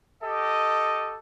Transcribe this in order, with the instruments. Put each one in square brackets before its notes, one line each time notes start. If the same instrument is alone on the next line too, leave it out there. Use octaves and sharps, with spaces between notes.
[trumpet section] G4 A4 D#5